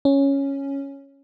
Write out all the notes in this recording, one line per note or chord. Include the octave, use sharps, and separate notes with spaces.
C#4